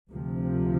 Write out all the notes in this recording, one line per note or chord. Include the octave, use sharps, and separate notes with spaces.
D2 C3 F3